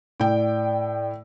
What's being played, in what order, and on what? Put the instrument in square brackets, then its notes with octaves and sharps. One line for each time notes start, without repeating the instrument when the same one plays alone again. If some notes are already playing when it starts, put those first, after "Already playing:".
[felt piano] A2 G5 [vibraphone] D5